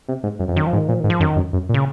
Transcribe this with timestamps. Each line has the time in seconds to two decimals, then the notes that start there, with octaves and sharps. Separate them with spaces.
0.08 C3
0.23 G#2
0.39 F#2
0.48 F2
0.56 F#2 D#3
0.67 F3
0.73 G#2
0.77 D#3
0.88 A#2 F3
1.00 G#2 D#3
1.10 F3
1.20 F#2 D#3
1.36 F#2
1.53 F#2
1.69 A#2
1.74 C#3